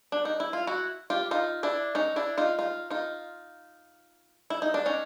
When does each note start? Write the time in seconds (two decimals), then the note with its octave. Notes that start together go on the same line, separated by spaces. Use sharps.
0.12 D4
0.25 D#4
0.40 E4
0.53 F4
0.67 E4 F#4
1.10 F4 G4
1.31 D#4 F4
1.63 D4 E4
1.95 C#4 D#4
2.16 D4 E4
2.38 D#4 F4
2.59 D#4 F4
2.90 D#4 F4
4.50 E4
4.62 D#4
4.74 D4
4.86 C#4 D#4